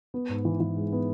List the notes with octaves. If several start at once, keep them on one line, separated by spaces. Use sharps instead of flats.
B3
G#2
E3
E3
G#3
B3